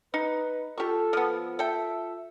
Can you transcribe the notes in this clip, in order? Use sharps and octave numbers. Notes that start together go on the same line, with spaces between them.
D#4 B4
F4 G4 A4 C#6
F3 B3
A4 E5 G5